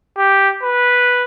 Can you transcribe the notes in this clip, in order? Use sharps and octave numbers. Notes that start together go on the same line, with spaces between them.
G4
B4